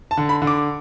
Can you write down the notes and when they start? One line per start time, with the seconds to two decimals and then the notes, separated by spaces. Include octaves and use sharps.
0.11 A5
0.17 D3
0.29 B5
0.42 D3
0.47 D6